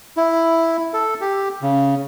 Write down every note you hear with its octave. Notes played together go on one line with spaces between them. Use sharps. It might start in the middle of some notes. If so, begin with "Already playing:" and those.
E4
A4
G4
C#3